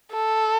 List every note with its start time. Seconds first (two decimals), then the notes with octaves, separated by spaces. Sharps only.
0.13 A4